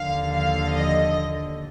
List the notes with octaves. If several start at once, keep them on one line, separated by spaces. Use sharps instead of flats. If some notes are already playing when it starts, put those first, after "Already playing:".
Already playing: D#2 D3 F3 F5
F5
D#5